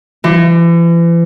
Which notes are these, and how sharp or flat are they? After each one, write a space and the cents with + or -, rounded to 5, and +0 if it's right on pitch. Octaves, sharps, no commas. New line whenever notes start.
E3 +40